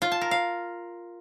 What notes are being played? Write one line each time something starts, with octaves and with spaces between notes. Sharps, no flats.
F4
A5
A#4
F5